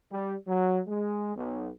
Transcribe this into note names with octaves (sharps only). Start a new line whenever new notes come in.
G3
F#3
G#3
B1